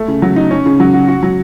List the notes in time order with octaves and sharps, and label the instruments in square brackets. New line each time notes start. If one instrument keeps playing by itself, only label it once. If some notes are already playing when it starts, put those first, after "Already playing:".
Already playing: [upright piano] A3
C#3
F#3
D#4
C#4
C#3
F#3
F#4
F#4
F#3